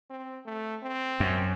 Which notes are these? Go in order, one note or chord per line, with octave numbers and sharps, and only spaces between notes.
C4
A3
C4
F#2